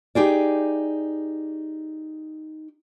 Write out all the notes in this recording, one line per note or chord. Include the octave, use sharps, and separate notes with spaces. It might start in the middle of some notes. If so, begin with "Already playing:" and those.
D#4 G4 G#4 D5